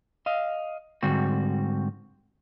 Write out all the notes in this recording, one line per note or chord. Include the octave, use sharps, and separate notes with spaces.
D#5 F5
G#2 D3 G3 C4 F#4